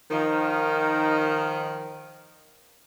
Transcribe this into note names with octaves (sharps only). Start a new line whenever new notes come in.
D#3 F3